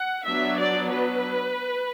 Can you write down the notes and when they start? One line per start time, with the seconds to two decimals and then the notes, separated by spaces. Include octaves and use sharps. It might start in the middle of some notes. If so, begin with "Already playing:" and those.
Already playing: F#5
0.24 F#3 B3 D4 E5
0.57 D5
0.90 B4